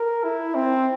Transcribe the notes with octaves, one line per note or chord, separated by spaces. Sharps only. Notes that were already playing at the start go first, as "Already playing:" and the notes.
Already playing: A#4
E4
C4